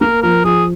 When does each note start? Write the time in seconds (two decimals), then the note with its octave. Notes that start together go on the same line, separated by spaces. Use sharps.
0.01 A#3 A#4
0.23 F3 A#4
0.44 F3 G#4